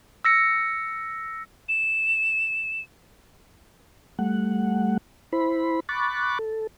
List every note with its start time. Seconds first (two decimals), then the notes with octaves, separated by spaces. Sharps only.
0.25 E6 A#6 C#7
1.69 E7
4.19 G3 A3 F#5
5.33 E4 C5 B5
5.89 B5 C#6 D6 F#6 A6
6.39 A4